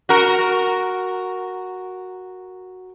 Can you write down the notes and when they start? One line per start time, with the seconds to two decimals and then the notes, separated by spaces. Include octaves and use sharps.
0.09 F#4 A#4